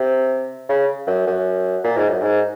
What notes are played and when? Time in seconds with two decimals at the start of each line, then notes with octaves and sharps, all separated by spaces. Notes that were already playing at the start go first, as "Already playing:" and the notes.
Already playing: C3
0.69 C#3
1.07 F#2
1.26 F#2
1.84 A#2
1.96 G#2
2.09 F#2
2.21 G#2